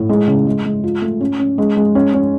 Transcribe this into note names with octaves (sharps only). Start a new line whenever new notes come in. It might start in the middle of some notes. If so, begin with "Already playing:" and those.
Already playing: A2
G#3
C#3
G#3
G#3
F4
A3
C#4
C#4
G#3
G#3
C#4
C#4